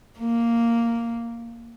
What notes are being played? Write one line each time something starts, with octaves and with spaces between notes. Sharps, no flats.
A#3